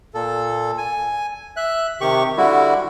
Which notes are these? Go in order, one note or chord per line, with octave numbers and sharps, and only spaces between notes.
A#2 A4
G#5
E5 F#6
C3 D#3 G4 C#6
D3 G3 E4 F#4